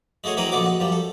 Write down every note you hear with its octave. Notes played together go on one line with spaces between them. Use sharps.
G#3 A3 F#4 G#4 C#5
E3 F#3 C4 G#4 A#4 B4
A#1 D3 G#3 B3 F#4 D6
F#4
F#2 F3 G3
A4